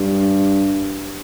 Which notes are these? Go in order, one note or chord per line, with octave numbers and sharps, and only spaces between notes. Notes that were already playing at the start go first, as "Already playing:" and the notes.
Already playing: G2